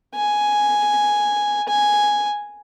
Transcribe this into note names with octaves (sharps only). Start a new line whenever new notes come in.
G#5
G#5